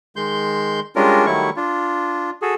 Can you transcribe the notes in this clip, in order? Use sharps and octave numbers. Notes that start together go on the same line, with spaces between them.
D#3 G#3 C6 G6
G3 G#3 C#4 D4 F4 A#4
D#3 F#3 G3 A3 E4 C#6
D4 F4
F#4 G#4 A4